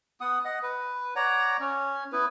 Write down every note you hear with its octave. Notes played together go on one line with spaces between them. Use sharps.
B3 F#5 D#6
D#5 F#5
B4
C#5 D5 F#5 A#5
C#4
B3 E4 B4